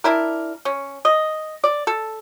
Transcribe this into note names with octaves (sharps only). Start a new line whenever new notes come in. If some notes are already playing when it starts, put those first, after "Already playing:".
D4 E4 A#4
C#4
D#5
D5
A4